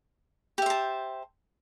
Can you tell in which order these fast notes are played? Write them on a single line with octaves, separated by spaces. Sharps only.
G4 E5 C5 A5